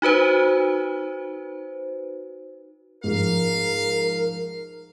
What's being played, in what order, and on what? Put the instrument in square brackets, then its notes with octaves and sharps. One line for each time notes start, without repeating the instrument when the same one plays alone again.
[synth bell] D#4 F#4 B4 C5
[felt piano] G#2 F3 [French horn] A#4 [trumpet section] F5